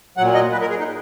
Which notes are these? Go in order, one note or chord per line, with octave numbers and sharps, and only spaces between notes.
A#2 F#3 F#5
D#5
B4
A#4
G#4
D#4